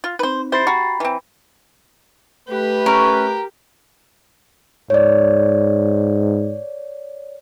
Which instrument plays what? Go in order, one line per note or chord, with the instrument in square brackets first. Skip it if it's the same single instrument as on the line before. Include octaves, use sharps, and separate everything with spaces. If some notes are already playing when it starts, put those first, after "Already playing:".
[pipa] F4
[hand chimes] C4 D#4 [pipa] B4 C5
[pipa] E4 C5 [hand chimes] G4 A6 C7
[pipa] F#4 [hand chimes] G5 A#5 B5
[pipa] E3 C4
[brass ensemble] A3 B4 [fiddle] G4
[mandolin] C#4 [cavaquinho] A#4
[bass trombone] G#2 [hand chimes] C#5 D5